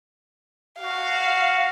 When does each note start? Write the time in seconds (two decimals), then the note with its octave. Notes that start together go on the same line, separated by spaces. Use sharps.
0.80 F#4 F5